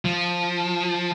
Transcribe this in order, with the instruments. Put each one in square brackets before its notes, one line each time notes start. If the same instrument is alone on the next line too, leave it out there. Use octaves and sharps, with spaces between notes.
[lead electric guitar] F3